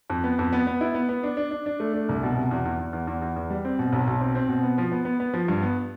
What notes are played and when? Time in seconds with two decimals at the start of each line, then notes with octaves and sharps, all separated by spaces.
0.10 F2
0.24 B3
0.39 F2
0.53 B3
0.67 B3
0.81 E4
0.94 B3
1.09 B3
1.23 D4
1.37 D4
1.51 D4
1.66 D4
1.80 A3
1.94 D4
2.09 C2
2.23 B2
2.36 C3
2.51 E2
2.65 E2
2.79 E2
2.93 E2
3.07 E2
3.22 E2
3.36 E2
3.50 G3
3.65 C4
3.79 B2
3.92 B1
4.07 B1
4.20 C4
4.35 C4
4.48 B2
4.63 B3
4.78 F3
4.92 B3
5.05 B3
5.20 B3
5.33 F3
5.48 G2
5.62 B3